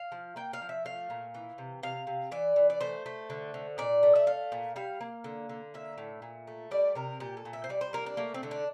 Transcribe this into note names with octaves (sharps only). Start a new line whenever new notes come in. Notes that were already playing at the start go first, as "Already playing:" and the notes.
Already playing: F5
F3
A#3 G5
F5
F3
E5
A3 F5
A#2
E3
C3
C3 F5
C3
E3 D5
E3
D5
A3 C5
A3
D3
D3
A#2 D5
A3
E5
A3 F5
A#2
G3 F5
A#3
D3
D3
A#3 E5
A2
A#2
A3
G3 D5
C3 A#4
A#2 G4
A4
A#2
E5
C5
G3 D5
C5
A#3 A#4
D4
A3 A#3
C4
D3
D4